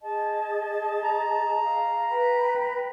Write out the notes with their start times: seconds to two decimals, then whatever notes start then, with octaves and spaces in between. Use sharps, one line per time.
0.02 G#4 D#5 A5
1.03 A#5
1.62 F5
2.09 B4 G5 B5